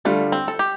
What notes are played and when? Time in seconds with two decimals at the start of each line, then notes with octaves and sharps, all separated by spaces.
0.05 D3 G3 A3 F4
0.32 C4
0.48 A4
0.59 G4